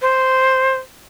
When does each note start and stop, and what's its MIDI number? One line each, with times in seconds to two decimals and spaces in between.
0.02 0.75 72